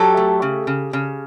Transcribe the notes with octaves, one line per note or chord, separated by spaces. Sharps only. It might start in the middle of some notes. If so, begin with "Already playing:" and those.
Already playing: F#3 G4 A4
A3
C#3
C#3
C#3